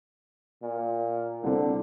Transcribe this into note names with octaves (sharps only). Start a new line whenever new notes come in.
A#2
C2 D3 C4